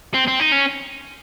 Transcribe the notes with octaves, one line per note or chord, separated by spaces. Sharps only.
C4
C4
D#4
C#4